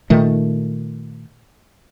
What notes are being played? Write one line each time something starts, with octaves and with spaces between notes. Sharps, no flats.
A#2 D#3 A3